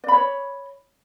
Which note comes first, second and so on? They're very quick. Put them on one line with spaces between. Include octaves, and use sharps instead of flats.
D5 B5 C#5